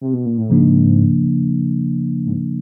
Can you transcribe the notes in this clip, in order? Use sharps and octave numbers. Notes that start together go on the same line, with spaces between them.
C3
B2
A#2
A2
G#2 C#3 F3 A#3 D4
G#2